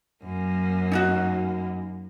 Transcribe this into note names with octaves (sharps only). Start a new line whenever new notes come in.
F#2 A#3
D#4 F4 F#4